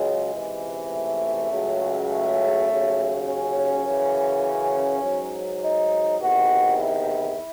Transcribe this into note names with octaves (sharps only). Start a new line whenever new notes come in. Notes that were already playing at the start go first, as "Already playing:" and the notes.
Already playing: C#2 C#3 F#3 G#3
C#2 C3 E3
A3
C#2 C#3 F#3
A3
D#2 C#3 F#3
C#4
F#2 C#3 E3
G#2 F#3
D#4
E2 C3 D#3 F#4
E4